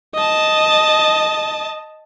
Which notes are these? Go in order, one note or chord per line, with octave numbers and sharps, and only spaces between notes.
D#5 A5